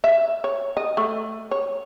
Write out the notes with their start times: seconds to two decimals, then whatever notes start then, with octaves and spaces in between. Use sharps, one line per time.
0.04 E5
0.44 C#5
0.77 D#5
0.97 A3
1.51 C#5